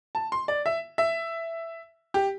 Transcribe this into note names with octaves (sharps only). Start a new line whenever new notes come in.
A5
C6
D5
E5
E5
G4